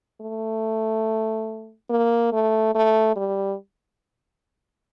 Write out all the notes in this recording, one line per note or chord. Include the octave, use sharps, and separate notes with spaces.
A3
A#3
A3
A3
G3